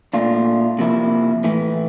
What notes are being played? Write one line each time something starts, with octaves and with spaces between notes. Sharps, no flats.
A#2 A3 D4 F4
C3 F3 A#3 E4
A2 E3 A3